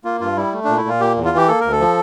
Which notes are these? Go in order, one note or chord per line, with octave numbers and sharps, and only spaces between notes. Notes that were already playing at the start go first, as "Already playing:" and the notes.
A#3 F4
G2 F4
G3 E4
A3
A#2 D4
E4
A#2 F4
A#3 G4
E2
F4
E3 G4
A#3 A4
D2 A#4
A4
F3